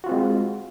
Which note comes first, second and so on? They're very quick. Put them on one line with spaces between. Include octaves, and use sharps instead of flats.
F#4 F4 C4 G#3